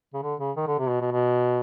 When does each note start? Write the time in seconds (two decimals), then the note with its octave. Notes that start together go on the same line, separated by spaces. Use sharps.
0.14 C#3
0.23 D3
0.40 C#3
0.57 D#3
0.67 D3
0.79 C3
0.90 B2
1.01 B2
1.12 B2